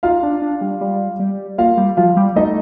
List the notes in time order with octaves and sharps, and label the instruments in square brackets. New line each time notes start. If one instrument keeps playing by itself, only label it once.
[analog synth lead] D#4 [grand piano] F4 F5
[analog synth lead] D4
D4
G3
G3
G3
[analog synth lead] A#3 [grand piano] F4 F5
[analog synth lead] G3
[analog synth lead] F3 [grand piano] F4 F5
[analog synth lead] G3
[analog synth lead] A3 [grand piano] D#4 D#5